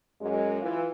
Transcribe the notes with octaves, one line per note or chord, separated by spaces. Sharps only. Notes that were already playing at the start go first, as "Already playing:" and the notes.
F#2 G#3
E3 F4